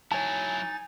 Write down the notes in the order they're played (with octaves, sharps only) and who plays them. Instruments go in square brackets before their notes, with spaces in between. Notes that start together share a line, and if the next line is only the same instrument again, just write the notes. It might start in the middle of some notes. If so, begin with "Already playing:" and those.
[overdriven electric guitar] F#3 E4 [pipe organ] D#4 A6 [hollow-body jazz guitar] C#5 A5 [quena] G#5